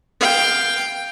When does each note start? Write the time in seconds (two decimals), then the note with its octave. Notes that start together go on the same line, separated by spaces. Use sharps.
0.21 F5 G5